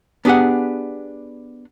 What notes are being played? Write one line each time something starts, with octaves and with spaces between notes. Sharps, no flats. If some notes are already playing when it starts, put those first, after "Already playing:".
B3 D4 G4 G#4 F#5